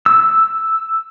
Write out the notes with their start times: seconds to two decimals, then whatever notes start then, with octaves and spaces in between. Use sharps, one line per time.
0.06 E6